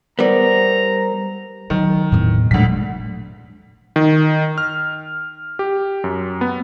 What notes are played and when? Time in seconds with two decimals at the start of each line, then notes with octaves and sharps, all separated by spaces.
0.19 G3 B3 A#4 C5 A#5
1.70 D#3 F#3
2.12 E2 A2 C3
2.51 D2 A#2 D#3 F#3 G#3 D4 B6
3.96 D#3
4.58 F6
5.59 G4
6.04 F#2
6.41 B3